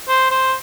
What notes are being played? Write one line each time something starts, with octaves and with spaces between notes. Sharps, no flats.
C5
C5